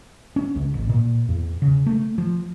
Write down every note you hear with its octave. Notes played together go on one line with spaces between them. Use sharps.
C#4
C#2
A1
A#2
E2
C#3
A3
F3